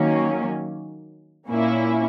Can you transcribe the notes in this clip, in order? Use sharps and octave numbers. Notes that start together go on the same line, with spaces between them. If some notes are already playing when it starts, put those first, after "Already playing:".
Already playing: D#3 F#3 A#3 C#4
A#2 A#3 C#4 E4